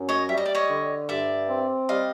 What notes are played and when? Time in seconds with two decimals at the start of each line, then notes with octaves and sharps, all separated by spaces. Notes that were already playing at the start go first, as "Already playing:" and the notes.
Already playing: F#2
0.09 C#5 D#5
0.28 G3 E5
0.38 D#5
0.46 D5
0.55 C#5 D#5
0.69 D3
1.09 G2 D5 E5
1.49 C4
1.89 G3 D#5 F5